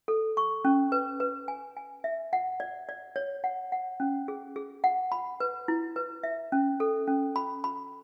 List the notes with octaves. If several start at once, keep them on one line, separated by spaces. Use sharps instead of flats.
A4
C#6
C#4
B4
B4
G#5
G#5
E5
F#5
D5
D5
C#5
F#5
F#5
C#4
G#4
G#4
F#5
B5
B4
E4
B4
E5
C#4
A4
C#4
B5
B5